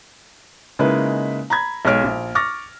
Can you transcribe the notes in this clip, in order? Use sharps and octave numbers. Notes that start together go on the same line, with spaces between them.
C#3 G#3 A#3 D#4 E4 B4
A#5 B5 G#6
B1 G#3 C#5 F6 D7
A#1
C#6 D6 F6 A6 A#6